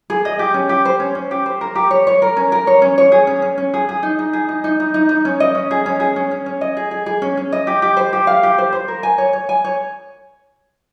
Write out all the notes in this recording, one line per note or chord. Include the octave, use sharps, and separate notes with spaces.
G#4
D#5
G4
C#4
G4
C5
C#4
C#4
G4
C5
A#4
G4
C#5
C#5
A#4
C#4
A#4
C#5
C#4
C#5
G#4
C#4
C#4
C#4
G#4
G#4
D#4
D#4
G#4
D#4
D#4
D#4
D#4
D#4
C#4
D#5
C#4
G#4
C#4
G#4
C#4
C#4
C#4
D#5
G#4
G#4
G#4
C#4
C#4
D#5
G4
G4
C5
G4
F5
G4
C5
C5
A#4
G#5
C#5
C#5
G#5
C#5